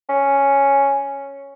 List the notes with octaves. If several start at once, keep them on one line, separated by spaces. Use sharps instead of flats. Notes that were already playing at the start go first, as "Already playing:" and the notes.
C#4